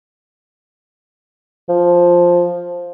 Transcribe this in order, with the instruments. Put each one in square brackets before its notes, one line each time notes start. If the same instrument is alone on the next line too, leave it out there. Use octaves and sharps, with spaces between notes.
[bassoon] F3